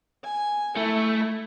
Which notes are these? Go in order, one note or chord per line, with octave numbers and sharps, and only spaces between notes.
G#5
A3 E4